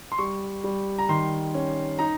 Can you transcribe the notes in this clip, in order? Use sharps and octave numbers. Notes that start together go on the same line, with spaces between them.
C6
G3 C#6
G3
A#5
D#3 C6
C#4
D#4 A#5